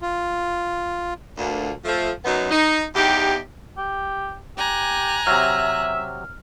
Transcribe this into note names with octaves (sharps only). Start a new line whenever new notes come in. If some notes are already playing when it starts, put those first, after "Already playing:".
F4
D2 A#2
F3 A3
F#2 F#3 B3 D#4
D#4
E2 D#4 G4
G4
G4 G#5 A#5 F#6
C3 F#3 E5 F6